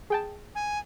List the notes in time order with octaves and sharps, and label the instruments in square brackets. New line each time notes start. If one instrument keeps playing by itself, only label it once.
[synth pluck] G#4 G5 A5
[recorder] G#5